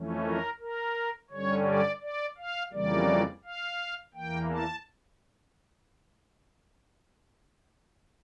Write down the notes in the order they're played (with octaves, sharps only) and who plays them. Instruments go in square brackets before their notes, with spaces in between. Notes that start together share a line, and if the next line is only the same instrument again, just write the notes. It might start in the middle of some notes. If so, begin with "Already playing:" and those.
Already playing: [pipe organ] F2 E3 A3 C#4
A#4
A#4
G2 D3 G3 C#4 C#5
D5
D5
F5
F2 C#3 E3 G3 A#3 D5
F5
E2 E3 A#3 G5
A5